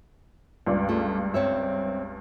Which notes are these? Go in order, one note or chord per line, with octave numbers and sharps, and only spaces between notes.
C#2 G2 D5
A3 F4
C4 C#5 E5